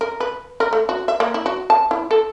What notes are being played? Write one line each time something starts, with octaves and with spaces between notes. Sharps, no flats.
A#4
B4
A#4
A3
F#4
E5
A#3
E4
F#4
A5
E4
A4